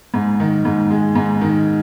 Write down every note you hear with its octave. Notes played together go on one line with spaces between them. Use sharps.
G#2
D#3
G#2
G#3
G#2
D#3